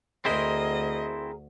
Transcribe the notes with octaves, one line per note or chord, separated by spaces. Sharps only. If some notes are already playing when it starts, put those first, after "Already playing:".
D2 C4 E4 G#4 A#4 C5 D#5